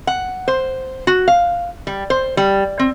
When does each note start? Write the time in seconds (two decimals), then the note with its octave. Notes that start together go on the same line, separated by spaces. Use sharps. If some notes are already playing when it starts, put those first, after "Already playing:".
0.07 F#5
0.48 C5
1.07 F#4
1.28 F5
1.87 G3
2.10 C5
2.37 G3
2.79 C4